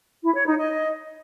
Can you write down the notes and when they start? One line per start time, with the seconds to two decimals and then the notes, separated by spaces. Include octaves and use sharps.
0.24 E4
0.35 C#5
0.46 D#4
0.57 D#5